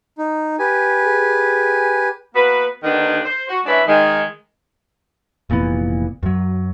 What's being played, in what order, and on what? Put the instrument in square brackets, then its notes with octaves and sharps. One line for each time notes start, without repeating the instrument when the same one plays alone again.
[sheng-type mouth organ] D#4
G4 B4 G#5
[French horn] G#4
[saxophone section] A#3 B3 F#4 B4
D#2 D3 D#3 B3 D4
C5
F#4
G#3 C#4 D4 E4 B4 E5
D#3 G#3
[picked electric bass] F1 A#2 E3 B3
F#2 F#3